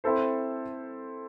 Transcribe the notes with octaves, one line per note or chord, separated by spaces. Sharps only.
C4 E4 A4 C5